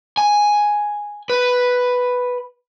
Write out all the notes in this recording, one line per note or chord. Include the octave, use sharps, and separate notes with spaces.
G#5
B4